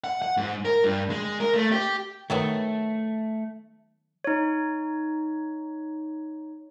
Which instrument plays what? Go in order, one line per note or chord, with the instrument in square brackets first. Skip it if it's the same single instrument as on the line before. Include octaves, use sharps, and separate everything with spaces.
[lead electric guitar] F#5
F#5
G#2
A#4
G2
G#3
A#4
A3
G4
[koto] D#3 F#3 B3 [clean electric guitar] A3
[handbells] D#4 C#5